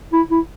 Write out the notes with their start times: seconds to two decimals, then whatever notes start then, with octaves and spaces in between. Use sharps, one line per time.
0.12 E4
0.31 E4